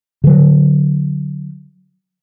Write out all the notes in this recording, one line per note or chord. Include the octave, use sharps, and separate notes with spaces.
D3 F#3